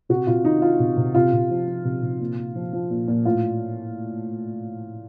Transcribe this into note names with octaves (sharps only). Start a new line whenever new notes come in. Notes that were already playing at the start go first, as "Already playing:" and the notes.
C3 F#4
C3 F4
D#3 D#4
D#3 F4
C3
C3
C3 F4
C3
F3
F3
C3
C3
A#2
A#2
F3
F3
A#2
A#2
A2 F4